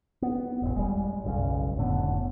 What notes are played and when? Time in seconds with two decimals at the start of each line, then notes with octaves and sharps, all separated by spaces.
0.22 B3
0.62 E1 A1
0.76 G3 G#3
1.24 F#1 B1 A#2 C#3
1.77 F1 A2 D3 B3